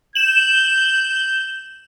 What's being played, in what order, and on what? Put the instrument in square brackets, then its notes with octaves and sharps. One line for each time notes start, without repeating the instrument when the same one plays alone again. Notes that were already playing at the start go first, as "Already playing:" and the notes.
[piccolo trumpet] G6 [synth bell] E7 F#7